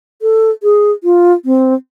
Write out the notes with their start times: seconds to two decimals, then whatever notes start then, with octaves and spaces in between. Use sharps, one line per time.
0.22 A4
0.63 G#4
1.04 F4
1.45 C4